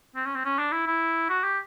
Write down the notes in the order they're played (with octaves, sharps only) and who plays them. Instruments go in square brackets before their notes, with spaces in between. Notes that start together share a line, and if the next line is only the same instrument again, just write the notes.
[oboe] C4
C#4
C4
C#4
D4
E4
E4
F#4
G4